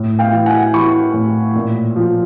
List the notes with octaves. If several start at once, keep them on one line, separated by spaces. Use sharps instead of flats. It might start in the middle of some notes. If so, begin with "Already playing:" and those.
Already playing: A2
F5 G5
E3
F#5 G#5
E3 B5 C#6
A2
A#2
F3